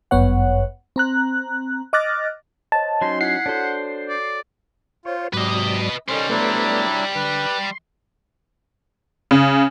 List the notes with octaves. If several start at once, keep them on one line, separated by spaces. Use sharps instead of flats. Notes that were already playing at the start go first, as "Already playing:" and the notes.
G1 F#2 B3 C#5 F#5
C4 A#5 F#6
D#5 D6 F6 F#6 A6 A#6
C5 C#5 D#5 A5
F#3 C#4 D#4 C6
E4 F#5 G#6 B6 C7
D4 F#4 A4 C5 C#5
D5
F4 C5 C#5
G#2 C3 F#3 B4 D5 D#5
D#3 G3 C#4 A4 C5 B5 F6
F#3 A3 B3 D4 E4
D3 B4
C6
C#3